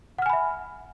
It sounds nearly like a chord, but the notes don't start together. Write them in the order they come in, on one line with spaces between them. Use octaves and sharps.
F#5 F6 G#5 B5 E5